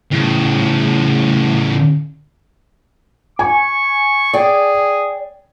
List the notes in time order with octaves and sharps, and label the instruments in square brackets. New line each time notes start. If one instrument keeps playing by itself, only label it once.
[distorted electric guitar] A2 C#3
[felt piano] G#5 [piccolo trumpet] C#6
[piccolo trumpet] G#4 [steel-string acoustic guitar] D5 G5